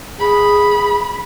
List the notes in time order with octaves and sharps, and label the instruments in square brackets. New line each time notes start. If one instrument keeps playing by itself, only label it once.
[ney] G#4 [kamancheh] B5